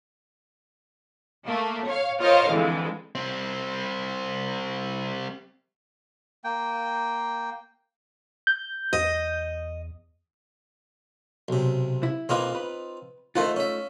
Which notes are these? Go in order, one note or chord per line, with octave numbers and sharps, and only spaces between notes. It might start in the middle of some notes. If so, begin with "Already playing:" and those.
A3 A#3
C#5 F5
F4 A#4 C5 C#5 D#5 F5
F2 D3 E3 G#3
G3 C4
A#3 G5
G6
E2 D#5
B1 C3
E4
B1 A#3 C4 D#4 F4 B4
B4
D#3 A3 D#4 F4 C5 F#5
C#4 E5